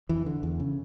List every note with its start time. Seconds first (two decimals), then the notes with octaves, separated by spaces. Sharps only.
0.09 F2 E3
0.26 D3
0.43 E2
0.60 C#3